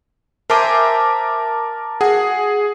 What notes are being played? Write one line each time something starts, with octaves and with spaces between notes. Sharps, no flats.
A#4 C5 E5 G#5 A5 D6
F#4 G#4